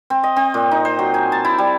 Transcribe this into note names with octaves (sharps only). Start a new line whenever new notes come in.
C4
D#5
C4
A#2
D#4
C5
F#3
G#5
A5
E4
G3